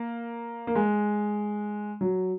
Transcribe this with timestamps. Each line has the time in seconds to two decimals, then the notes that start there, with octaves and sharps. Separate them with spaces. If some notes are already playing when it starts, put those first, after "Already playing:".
Already playing: A#3
0.67 A#3
0.75 G#3
2.01 F#3